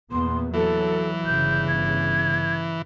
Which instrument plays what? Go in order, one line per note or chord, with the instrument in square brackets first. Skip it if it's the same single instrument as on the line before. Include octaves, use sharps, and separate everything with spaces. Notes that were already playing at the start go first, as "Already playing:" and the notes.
[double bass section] E2 A#2 B3 [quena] C6
[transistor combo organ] E3 [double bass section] F#3 [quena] A4
[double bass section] G1 C#3 [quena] G6
[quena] G#6